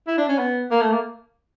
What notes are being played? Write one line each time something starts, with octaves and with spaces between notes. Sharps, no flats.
E4
D4
C#4
B3
A#3
A3
A#3